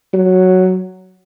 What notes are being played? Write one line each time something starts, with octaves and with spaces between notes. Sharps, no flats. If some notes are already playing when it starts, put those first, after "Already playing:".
F#3